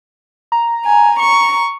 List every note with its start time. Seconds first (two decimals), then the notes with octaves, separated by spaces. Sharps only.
0.52 A#5
0.84 G#5
1.18 C#6